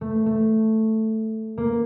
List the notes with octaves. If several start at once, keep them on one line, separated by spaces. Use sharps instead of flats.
A3
A3
A#3